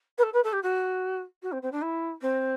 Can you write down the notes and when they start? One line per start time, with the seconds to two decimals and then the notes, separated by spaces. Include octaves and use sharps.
0.18 B4
0.23 A4
0.33 B4
0.44 A4
0.53 G4
0.63 F#4
1.42 F#4
1.52 C4
1.62 C4
1.72 D4
1.82 E4
2.21 C4